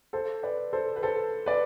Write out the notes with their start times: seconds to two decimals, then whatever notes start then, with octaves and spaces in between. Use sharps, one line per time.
0.13 A4 C5
0.43 B4 D5
0.73 A4 C5
0.96 B4
1.02 A4 C5
1.46 B4 D5